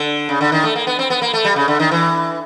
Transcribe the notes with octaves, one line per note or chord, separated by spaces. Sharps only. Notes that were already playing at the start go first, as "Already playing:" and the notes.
Already playing: D3
C#3
D3
D#3
A3
A#3
B3
C4
B3
A#3
A3
G3
C#3
D3
D#3
E3